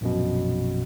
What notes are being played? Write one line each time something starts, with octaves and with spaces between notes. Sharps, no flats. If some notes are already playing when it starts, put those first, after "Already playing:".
A#1 F#2 B2